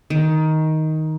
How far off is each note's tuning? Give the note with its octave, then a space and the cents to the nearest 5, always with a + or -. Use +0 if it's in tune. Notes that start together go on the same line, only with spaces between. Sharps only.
D#3 +10